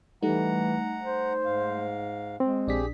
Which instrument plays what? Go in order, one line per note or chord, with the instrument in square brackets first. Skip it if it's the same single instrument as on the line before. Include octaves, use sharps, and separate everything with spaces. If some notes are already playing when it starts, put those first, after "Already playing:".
[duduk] E3 [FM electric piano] G3 A3 D#4 [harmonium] F#5 A#5
[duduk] C5
[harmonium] G#2 F5
[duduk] G#3 [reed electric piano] C4
[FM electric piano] A#1 D4 B6 [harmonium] G4 G#4